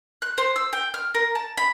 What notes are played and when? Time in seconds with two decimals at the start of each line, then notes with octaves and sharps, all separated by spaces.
0.22 F#6
0.38 C5
0.56 E6
0.73 G5
0.94 F6
1.15 A#4
1.35 A5
1.57 B5